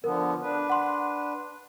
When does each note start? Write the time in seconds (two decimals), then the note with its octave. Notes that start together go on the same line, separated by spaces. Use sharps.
0.04 D3 F3 B3 A#4
0.42 D4 B4
0.70 F#5 C6